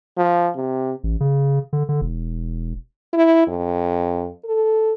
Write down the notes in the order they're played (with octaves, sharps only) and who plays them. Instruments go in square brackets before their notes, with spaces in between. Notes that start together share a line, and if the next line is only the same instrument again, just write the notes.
[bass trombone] F3
C3
[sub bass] A1
C#3
D3
D3
E1
[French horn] E4
F2
A4